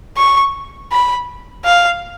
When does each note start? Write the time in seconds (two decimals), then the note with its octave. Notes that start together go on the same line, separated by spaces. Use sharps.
0.17 C#6
0.91 B5
1.65 F5